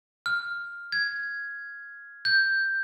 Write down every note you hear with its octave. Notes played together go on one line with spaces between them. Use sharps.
F6
G#6
G6